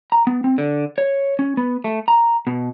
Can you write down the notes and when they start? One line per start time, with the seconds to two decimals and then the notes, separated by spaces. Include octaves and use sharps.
0.12 A#5
0.27 B3
0.44 C4
0.58 D3
0.98 C#5
1.39 C#4
1.57 B3
1.84 A3
2.08 A#5
2.47 B2